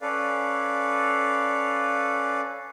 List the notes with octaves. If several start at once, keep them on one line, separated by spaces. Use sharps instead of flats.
C#4 A4 B4 D5 F5